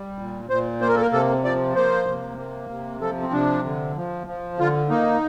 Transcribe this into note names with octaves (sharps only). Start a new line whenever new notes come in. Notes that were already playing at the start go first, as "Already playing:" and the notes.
Already playing: G3
A#2
A#2 C5
A#3 C5
A#4
A4
A#4
C3 A4
F3 D5
A#3 C5
C3
A#3
C3
F3 A4
C4
C3 D4
D3
F3
F3
D3 F4
A#3 D#4